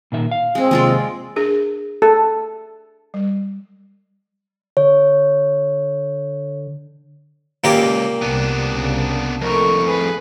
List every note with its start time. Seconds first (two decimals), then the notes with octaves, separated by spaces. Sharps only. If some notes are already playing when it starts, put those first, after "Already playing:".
0.12 A#2 D#3 E5
0.31 F5
0.55 G#3 C4 G#4
0.71 D#2 C3 G#3 F4 D5
1.36 D4 G#4 A#4
2.02 A4
3.14 G3
4.77 D3 C#5
7.64 C#2 A#2 A#3 G4
8.22 C2 C3 B3 D4
8.73 C2 C#3
9.41 F2 A2 A3 A#4 C#6
9.87 G#4 B4